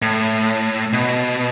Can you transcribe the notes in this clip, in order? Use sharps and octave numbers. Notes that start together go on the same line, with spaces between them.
A2
B2